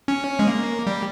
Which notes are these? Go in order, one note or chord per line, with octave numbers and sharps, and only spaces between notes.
C#4
G#3
A#3
G3